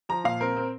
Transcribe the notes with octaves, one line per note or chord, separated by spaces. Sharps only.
F3 A#5
A#2 F5
C4 A#4
C4